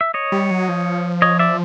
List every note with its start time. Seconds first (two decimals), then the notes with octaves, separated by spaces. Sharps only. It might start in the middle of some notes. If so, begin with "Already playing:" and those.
0.01 E5
0.14 C#5 D#5
0.32 G3
0.51 F#3
0.69 F3
1.22 C#5 D#5
1.39 D5 E5